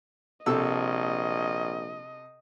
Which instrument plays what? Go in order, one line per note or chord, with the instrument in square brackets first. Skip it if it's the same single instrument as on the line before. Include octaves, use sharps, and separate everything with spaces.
[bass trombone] A#1 [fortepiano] C3 A4 E6 [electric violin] D#5